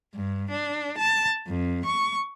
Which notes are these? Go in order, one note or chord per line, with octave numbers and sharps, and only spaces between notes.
G2
D4
A5
F2
C#6